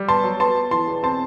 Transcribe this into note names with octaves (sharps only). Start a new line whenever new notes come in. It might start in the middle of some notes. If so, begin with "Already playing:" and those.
Already playing: G3
B3 A5 C6
F#3
B3 A5 C6
B3
E3 A5 C6
E1
C4 A5 C6